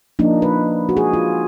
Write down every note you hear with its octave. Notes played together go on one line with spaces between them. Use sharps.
F3 A#3 D4 D#4
B4
F#4
G#4
F4